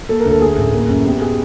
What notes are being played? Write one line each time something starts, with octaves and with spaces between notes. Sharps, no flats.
A#3 A4
A#4
D2 A4
A3 G#4
A1
A#3
F#2
B3 G4
G#4